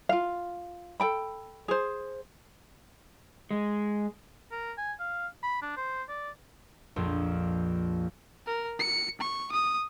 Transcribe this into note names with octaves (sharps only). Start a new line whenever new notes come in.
F4 F5
A4 G5 B5
G#4 C5
G#3
A#4
G#5
F5
B5
D4
C5
D5
A#1 F2
A#4
C#7
C#6
D#6